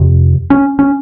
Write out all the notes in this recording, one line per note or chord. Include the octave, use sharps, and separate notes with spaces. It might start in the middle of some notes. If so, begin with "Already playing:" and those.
Already playing: F2 C3
C#4
C#4